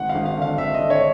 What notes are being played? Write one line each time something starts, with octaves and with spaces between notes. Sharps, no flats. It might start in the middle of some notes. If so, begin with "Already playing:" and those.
Already playing: G#1 F#5
F5
G#1
F5
D3 F5
G#1 E5
D3 D#5
C#5